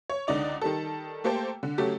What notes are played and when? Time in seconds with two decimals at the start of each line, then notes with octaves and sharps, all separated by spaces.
0.10 C#5
0.27 C#2 D3 D#4 D5 F7
0.62 D#3 G3 A4
1.24 A3 A#3 G4 A4 C5 G5
1.63 D3
1.78 C#3 F#3 A3 G4